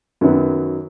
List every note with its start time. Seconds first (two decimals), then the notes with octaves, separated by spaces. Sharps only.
0.21 F#2 D#3 F#3 B3